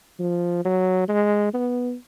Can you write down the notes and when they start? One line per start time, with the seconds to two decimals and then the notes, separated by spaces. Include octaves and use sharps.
0.19 F3
0.65 F#3
1.09 G#3
1.54 B3